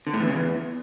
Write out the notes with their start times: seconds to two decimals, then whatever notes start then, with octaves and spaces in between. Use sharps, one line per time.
0.07 D3
0.13 A2
0.20 E2
0.27 C#3
0.34 E2